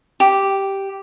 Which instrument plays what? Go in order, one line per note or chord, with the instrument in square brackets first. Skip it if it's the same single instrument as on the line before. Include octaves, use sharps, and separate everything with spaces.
[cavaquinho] G4